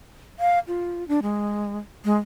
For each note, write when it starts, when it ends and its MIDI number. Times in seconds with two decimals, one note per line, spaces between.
0.39 0.59 77
0.68 1.06 65
1.08 1.20 62
1.22 1.78 56
2.05 2.16 56